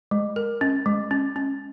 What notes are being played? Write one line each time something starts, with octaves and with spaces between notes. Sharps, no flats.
G#3
A#4
C#4
G#3
C#4
C#4